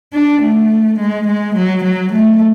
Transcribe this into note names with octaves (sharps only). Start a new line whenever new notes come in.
D4
A3
G#3
G#3
F#3
F#3
A3